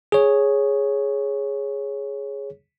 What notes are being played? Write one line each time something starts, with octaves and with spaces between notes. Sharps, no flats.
G#4 C#5